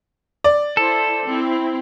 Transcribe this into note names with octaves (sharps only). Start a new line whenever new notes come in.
D5
E4 A4 C5
C4 E4